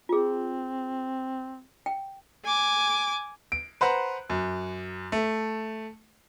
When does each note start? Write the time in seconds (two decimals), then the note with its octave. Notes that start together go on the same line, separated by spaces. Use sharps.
0.09 C4 F4 G#4
1.86 G5
2.45 G#5 D6
3.52 D7
3.81 B4 C5 F#5 A#5 F#6
4.30 F#2
5.12 A3